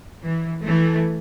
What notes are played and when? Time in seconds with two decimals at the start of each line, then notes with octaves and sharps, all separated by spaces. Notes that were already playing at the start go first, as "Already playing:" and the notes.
0.22 E3
0.63 E3 A3